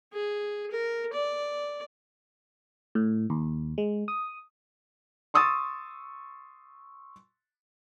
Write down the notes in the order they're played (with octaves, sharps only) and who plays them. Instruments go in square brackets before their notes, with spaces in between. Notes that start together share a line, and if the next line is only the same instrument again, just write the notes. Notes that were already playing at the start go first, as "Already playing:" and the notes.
[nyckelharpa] G#4
A#4
D5
[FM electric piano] A2
D#2
G#3
D#6
[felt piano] C6 C#6 D#6 E6 A6